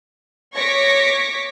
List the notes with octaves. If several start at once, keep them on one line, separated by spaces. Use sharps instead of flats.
C#5 C#6 D6 A#6 B6